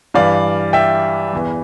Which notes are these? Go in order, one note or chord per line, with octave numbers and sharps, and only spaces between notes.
G2 E3 D5 F5
E5 G5
E2 E3